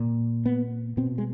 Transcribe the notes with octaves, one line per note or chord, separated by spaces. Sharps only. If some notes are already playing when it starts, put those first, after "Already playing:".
Already playing: A#2
B3
B2 C4
G#3